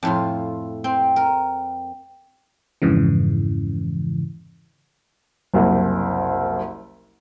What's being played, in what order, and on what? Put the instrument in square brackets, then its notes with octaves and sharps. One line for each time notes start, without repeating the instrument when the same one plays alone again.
[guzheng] F2 A2 F4
C4
A#4
[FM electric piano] F2 G#2 C#3 E3
[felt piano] F#1 C2